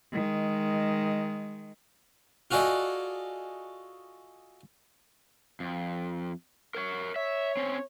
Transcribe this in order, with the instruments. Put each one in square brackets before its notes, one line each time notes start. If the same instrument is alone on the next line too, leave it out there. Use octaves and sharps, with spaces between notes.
[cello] D#3 G#3
[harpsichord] F4 F#4 G#4 A4 D5 D#5
[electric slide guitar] F2
A#4 C5 C#5
[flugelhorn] C#5 [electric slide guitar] E5
[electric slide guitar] C4 C#4